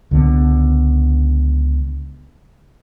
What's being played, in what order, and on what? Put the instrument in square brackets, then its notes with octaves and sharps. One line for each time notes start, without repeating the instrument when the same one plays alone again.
[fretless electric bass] C#2 D3 B3